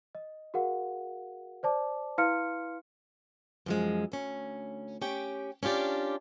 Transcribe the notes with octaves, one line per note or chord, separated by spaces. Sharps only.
D#5
F#4 G#4 A#4 F5 F#5
C5 D5 A5 D6
E4 B4 F5 C6 F6 C#7
F#2 F3 G#3
D2 C#4
C#4 G4 G5
C#4 D4 F4 G4 D5